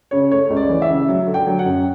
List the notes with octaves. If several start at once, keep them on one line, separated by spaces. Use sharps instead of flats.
C#3 C#5
A3 C#5
C#2
D5
E3
E5
C#3
F#3
D3
G5
F#3
F#5
F#2